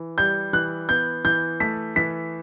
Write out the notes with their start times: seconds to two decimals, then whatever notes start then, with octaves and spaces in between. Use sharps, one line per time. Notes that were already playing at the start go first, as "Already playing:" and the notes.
Already playing: E3
0.18 G3 G6
0.53 E3 F#6
0.89 B3 G6
1.25 E3 G6
1.60 A3 B6
1.96 E3 B6